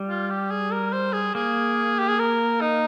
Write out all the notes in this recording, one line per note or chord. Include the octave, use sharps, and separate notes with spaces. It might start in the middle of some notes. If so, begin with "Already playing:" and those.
Already playing: G3
F4
G4
G#4
A#4
C5
G#4
A#3 G#4
G4
G#4
A#4
D#4